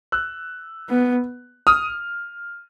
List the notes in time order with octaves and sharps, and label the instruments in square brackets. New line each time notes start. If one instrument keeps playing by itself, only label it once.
[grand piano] E6 F#6
[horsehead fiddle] B3
[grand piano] D#6 F6